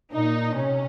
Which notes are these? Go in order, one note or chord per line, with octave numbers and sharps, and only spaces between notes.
A#2 D#4
C3 C#4